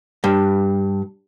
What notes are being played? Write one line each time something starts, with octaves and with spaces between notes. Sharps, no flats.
G2